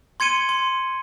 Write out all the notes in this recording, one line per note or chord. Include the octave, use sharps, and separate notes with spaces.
C6 G#6 C#7 D#7 G7
C6